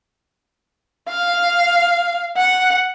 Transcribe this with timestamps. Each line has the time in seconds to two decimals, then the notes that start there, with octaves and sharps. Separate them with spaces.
1.09 F5
2.37 F#5